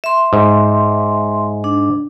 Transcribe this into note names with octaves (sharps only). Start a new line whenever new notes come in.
E5 C6
G#2
D4